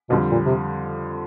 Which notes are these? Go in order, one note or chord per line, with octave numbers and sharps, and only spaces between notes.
F2 B2 D3 G3
A#2
C3